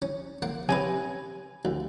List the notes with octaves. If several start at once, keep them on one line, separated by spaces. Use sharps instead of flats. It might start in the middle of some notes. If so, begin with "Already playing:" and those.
C#4
A#3 F#5
C3 C#4 B4 G#5
D2